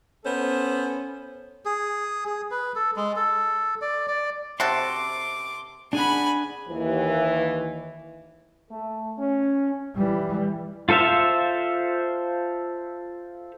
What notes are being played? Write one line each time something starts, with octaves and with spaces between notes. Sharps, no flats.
B3 C#4 A4 C5
G#4
G#4
B4
A4
G#3
A4
D5
D5
C3 F#4 A4 C6 D6
D4 G#4 F#5 G#5 B5
D#2 E3
A3 A4
C#4
E3 G3
F4 A4 C5 E5 F5